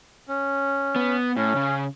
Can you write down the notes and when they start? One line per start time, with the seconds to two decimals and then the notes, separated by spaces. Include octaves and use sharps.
0.28 C#4
0.96 B3
1.37 A2 C#4
1.56 C#3